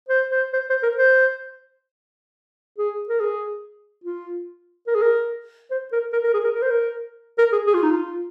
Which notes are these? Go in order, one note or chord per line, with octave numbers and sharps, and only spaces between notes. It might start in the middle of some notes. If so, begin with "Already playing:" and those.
C5
C5
C5
C5
A#4
C5
G#4
A#4
G#4
F4
A#4
G#4
A#4
C5
A#4
A#4
A#4
G#4
A#4
A#4
C5
A#4
A#4
G#4
G#4
F4
D#4
F4